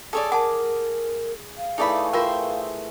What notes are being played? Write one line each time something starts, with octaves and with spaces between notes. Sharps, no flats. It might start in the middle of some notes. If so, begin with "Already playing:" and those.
G#4 A4 C#5 D5
A#4 F#5 A5 D6
F5
E3 A3 D#4 G#4 D5 B5
F4 A#4 C5 E5 G5 C6